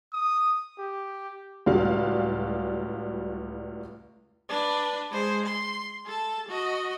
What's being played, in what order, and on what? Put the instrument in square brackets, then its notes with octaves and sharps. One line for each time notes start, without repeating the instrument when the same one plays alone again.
[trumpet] D#6
G4
[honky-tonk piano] C#2 A2 G3 F#4 F5
[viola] D4 B4
G#3 C5
C6
A4 A5
F#4 D#5